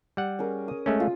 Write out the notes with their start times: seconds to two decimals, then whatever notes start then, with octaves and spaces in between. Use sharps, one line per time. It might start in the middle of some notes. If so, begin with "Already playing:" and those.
0.17 G3 F#5
0.39 C#4 G#4 A#4
0.68 D#6
0.86 G#3 A3 C#4
1.00 F4